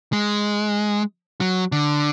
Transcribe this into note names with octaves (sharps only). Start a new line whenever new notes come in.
G#3
F#3
D3